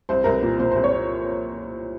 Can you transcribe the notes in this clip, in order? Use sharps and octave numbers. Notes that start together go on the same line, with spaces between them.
C2 C5
C2 A#4
B4
A#2
A#2 C5
C2 C5
C#5